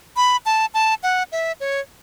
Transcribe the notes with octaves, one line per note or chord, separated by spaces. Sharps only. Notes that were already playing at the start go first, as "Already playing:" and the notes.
B5
A5
A5
F#5
E5
C#5